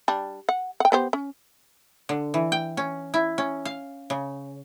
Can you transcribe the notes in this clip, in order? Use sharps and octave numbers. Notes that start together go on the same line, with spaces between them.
G3 D4
F#5
F#5 G5
B3 G4 C5
C#4
D3
E3
G5
C#4
E4
C#4
F5
C#3